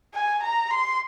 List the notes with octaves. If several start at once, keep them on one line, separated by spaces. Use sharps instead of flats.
G#5
A#5
C6